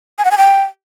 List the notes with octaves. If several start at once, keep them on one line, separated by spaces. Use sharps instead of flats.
G#5
F#5
G#5
G5